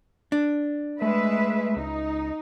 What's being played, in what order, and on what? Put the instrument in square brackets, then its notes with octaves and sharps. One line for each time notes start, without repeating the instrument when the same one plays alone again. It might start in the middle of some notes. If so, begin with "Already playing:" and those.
[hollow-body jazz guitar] D4
[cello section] G#3 B4 E5 [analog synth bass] A3
[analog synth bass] C#2 [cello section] D#4